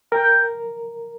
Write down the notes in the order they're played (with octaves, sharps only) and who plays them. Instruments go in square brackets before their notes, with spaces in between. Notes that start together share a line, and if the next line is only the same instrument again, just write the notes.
[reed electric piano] A#4 [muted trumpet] G5